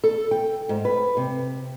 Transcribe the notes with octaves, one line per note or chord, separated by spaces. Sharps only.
A4
G5
G#2
B4
C3